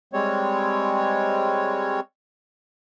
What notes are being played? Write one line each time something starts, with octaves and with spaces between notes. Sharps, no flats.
G3 G#3 C4 C#5